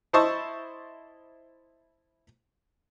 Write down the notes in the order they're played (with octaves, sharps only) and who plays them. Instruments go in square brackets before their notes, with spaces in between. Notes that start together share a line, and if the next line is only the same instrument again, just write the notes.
[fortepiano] E4 C5 D#5 A5 C#6 E6